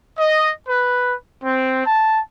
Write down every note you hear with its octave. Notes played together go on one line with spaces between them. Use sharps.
D#5
B4
C4
A5